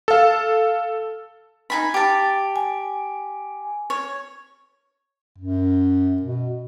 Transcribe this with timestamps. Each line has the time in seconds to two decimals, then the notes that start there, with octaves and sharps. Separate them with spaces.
0.08 A4 F5
1.70 D#4 G#5 B5
1.94 G4 A5
2.56 G#5
3.90 C#5
5.39 F#2
6.22 B2